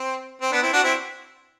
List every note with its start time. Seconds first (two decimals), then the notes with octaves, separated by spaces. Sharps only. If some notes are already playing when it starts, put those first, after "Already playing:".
Already playing: C4
0.41 C4
0.52 B3 D4
0.62 C4 E4
0.73 D4 F#4
0.84 C4 E4